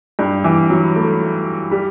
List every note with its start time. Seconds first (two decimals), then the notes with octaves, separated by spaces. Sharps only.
0.19 G2
0.44 E3
0.70 F#3
0.96 A3
1.71 G3